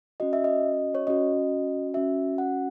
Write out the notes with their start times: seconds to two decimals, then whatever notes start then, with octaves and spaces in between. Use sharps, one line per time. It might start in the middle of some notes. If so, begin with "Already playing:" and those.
0.20 C#4 F#4 D#5
0.33 E5
0.44 D#5
0.95 C#5
1.07 C#4 F#4 D#5
1.94 C#4 F#4 E5
2.38 F#5